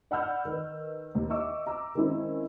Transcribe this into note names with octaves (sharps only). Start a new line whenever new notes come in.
D5 F#5 B5 E6 F6 G6
D#3 B4
D#2
D#5 E5 C#6 D6 E6
A#5 D6 E6
D#3 G#3 C4 C#4 E4